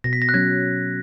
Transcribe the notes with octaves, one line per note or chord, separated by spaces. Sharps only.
B2 A#6
B6
A#6
F#6
F#3 C#4 G#6